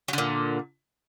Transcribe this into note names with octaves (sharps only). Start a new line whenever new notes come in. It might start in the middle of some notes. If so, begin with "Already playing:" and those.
A#2 D3 F#3